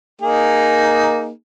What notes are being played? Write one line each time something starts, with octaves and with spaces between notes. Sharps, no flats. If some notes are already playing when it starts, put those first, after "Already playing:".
A#3 D#4 G#4